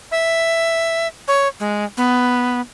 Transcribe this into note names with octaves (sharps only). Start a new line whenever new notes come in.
E5
C#5
G#3
B3